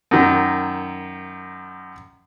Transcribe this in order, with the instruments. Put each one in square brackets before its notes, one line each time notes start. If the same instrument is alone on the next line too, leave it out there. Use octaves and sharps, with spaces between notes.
[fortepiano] F#2 D#3